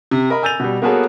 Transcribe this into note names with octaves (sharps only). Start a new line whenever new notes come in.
C3
A#4 D#5 B5
G#5 E6 G6 A6 D#7 F7
B2 G3
A#3 B3 F#4 G#4 A4 C#5